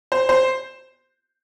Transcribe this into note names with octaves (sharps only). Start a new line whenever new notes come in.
C5
C5